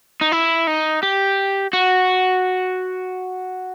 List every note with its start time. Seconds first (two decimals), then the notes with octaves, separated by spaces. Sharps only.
0.21 D#4
0.32 E4
0.67 D#4
1.03 G4
1.73 F#4